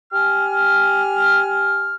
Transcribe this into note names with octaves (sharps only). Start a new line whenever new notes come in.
G4 G#5 F6